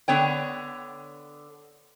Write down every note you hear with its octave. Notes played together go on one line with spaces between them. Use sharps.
D3 B3 C#5 G5